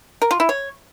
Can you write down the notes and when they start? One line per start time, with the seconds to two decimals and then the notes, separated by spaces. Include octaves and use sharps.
0.22 A#4
0.31 F4
0.40 E4
0.49 C#5